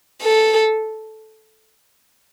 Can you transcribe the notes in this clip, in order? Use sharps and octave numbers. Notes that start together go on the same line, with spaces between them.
A4